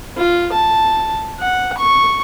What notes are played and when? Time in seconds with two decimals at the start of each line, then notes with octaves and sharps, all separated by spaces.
0.17 F4
0.53 A5
1.40 F#5
1.78 C#6